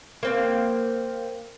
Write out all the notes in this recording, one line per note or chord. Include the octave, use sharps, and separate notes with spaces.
A#3 C4